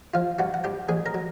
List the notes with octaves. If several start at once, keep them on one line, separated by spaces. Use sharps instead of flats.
F3 F4 F5
G2 F#4 F#5
F#5
G2 G4 G5
A1 G#4 G#5
A#4 A#5
F#3